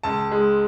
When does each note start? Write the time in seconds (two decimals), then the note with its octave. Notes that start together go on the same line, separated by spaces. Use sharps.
0.03 C#2 A5
0.31 G#3